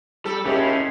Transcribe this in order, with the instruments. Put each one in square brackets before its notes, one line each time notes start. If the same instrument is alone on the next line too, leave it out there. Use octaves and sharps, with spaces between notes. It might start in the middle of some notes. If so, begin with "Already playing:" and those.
[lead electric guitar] G3 [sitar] A4
[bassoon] D#2 [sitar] C#3 [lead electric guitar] C#4 E4 [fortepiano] G4 G#4